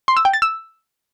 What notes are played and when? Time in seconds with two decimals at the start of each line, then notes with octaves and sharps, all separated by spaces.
0.08 C6
0.17 E6
0.25 G5
0.34 A6
0.42 E6